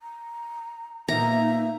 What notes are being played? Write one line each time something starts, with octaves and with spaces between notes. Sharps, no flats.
A#5
A#2 A#3 B3 D#4 E5 A#5